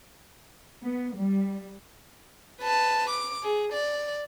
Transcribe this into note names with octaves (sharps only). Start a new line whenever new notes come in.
B3
G3
B4 A5
D6
G#4
D5